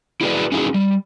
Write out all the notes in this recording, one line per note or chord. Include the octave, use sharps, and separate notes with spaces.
E4 F#4 G#4 A#4 B4 D5
C#4 D#4 E4 F#4 G#4
G3